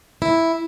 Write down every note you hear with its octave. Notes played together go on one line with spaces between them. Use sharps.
E4